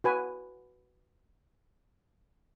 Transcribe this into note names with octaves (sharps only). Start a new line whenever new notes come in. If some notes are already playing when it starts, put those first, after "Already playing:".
F#4 B4 G#5